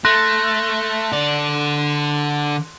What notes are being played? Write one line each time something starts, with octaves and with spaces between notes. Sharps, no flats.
A3 C6 F#6 A#6
D3 D5